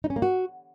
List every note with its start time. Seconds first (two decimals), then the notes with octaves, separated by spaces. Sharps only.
0.04 D#4
0.10 C#4
0.16 A#3
0.22 F#4